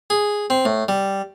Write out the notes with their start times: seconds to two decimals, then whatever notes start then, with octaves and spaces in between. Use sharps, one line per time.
0.10 G#4
0.50 C4
0.65 A2
0.88 G3